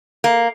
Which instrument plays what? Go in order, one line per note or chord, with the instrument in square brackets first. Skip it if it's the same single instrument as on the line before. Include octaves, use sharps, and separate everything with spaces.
[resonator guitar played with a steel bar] A#3